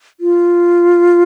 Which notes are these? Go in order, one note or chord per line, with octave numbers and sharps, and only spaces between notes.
F4